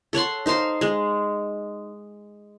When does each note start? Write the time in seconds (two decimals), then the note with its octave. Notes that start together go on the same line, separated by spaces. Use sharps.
0.13 A4 C#5 F#5 C6
0.46 D#4 C5 F5 C6
0.81 G#3